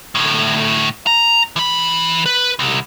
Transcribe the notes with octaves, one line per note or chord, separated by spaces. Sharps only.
D2 A2
A#5
E3 B5
B4
C2